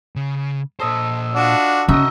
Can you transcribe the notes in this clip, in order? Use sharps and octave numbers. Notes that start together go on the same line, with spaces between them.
C#3
A#2 A4 C5 D#5 E5
D4 F4 F#4
C#3 D#4 F#4 D#5 E5 E6